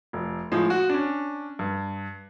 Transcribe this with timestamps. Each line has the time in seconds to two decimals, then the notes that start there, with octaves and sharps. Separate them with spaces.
0.13 F1
0.52 A2 F3 G#3
0.70 F#4
0.90 C#4 D4
1.59 G2